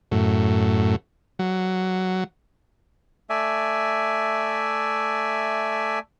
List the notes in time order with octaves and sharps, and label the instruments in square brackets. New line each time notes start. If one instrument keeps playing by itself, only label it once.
[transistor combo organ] F#2 A2
F#3
[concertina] A3 D5 E5 G#5